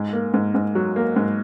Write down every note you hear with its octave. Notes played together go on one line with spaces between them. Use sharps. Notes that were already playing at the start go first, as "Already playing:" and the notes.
Already playing: G#2
A#3
G#2
G#2
F#3
A#3
G#2